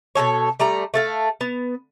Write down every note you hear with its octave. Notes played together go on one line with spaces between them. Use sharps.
B2 F#3 A4 C#5
G3 A3 A#5
A3 A4 F5
B3